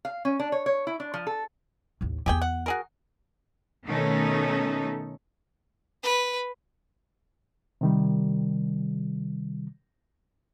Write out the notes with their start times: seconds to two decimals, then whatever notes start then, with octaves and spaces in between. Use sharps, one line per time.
0.05 F5
0.25 C#4
0.40 D4
0.52 C#5
0.66 C#5
0.87 E4
1.00 D4
1.14 F3
1.27 A4
2.01 A1 D#2
2.26 E2 B3 G4 G#4 G5
2.42 F#5
2.66 F#4 G#4 A#4
3.87 B2 D#3 A3 C#4 D#4 A4
6.03 B4
7.81 C3 D#3 G3